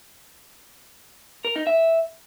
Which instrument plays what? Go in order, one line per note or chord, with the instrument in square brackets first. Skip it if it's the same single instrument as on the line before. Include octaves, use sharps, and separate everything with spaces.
[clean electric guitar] A#4
D#4
E5